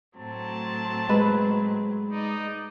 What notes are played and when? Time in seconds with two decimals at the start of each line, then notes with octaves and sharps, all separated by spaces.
0.16 A2 F#3 C4 A5
1.09 G#3 B4
2.10 D#4 D5 D#5